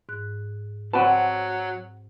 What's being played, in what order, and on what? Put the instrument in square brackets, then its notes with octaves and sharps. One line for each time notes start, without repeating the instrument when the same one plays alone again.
[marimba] G#2 F#6
[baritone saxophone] F#3 [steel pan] C4 F#4 B4 [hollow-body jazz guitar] F#5 A5